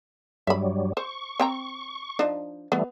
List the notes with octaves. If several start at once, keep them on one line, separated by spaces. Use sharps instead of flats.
G2 F#3 G3 E5 B5
C5 C#6
C4 G5 A#5
F3 D4 D#4
E3 G3 A3 B3